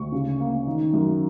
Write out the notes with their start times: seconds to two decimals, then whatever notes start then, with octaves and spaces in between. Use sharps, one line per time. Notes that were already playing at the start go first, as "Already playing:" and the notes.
Already playing: D2 C#6
0.12 C#3
0.40 A#3
0.67 D#3
0.93 F#2